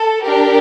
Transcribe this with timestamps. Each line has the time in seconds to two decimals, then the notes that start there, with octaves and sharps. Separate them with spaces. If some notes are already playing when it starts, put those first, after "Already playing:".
Already playing: A4
0.25 D4 G4 A#4